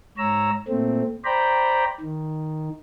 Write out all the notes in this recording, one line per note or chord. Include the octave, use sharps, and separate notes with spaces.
G#2 C#5 A#5 E6
A#2 A3 C4
C5 D5 G5 A#5 B5
D#3